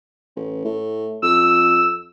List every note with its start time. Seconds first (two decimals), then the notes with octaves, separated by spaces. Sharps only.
0.36 A1
0.65 A2
1.22 F2 E6